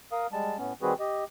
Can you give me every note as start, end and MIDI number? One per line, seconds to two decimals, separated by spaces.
0.12 0.27 70
0.12 0.27 77
0.12 0.27 87
0.32 0.57 55
0.32 0.57 56
0.32 0.57 81
0.58 0.73 45
0.58 0.73 59
0.58 0.73 61
0.82 0.94 51
0.82 0.94 55
0.82 0.94 60
0.82 0.94 66
0.82 0.94 68
0.82 0.94 71
0.99 1.24 67
0.99 1.24 75